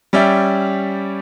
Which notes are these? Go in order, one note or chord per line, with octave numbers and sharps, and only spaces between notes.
G3 C#4 D5 E5 G5